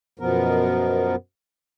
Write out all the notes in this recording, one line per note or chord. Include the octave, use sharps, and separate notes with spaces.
F#2 B2 F3 B3 A#4